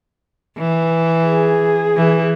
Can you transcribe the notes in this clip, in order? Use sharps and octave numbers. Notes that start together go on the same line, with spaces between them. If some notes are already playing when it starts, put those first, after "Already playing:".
E3
G#4
E3